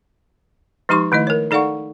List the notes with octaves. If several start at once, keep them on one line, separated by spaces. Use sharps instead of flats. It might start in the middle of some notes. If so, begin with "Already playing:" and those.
F3 G#3 D#4 G4 C6 C#6
D#3 A3 E4 D#5
A#4 C#5
D#4 A4 D5 F5 F#5 C#6